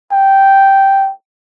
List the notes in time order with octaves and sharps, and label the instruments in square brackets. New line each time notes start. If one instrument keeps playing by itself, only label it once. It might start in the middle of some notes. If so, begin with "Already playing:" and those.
[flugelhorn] G5